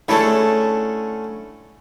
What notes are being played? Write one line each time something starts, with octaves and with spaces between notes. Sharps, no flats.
D3 A3 C#4 E4 G#4 A4